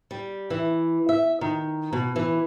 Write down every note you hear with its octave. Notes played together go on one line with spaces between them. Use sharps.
G3
E3
E5
D#3
B2
E3